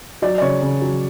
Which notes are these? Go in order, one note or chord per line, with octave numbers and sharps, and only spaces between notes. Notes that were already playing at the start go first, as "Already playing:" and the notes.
F#3 D5
D5
C#3 C#5
C#3
F#3